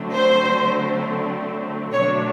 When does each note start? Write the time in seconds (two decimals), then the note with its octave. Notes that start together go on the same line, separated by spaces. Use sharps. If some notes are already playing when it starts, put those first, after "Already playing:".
Already playing: D3 F#3 A3 C4
0.14 C5
1.94 B2 F#3 A3 D4 C#5